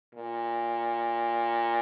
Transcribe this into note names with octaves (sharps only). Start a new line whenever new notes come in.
A#2